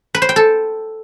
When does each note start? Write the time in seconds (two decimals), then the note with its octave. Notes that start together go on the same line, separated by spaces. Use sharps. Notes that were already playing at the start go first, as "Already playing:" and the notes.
0.15 B4
0.22 C5
0.29 G5
0.36 A4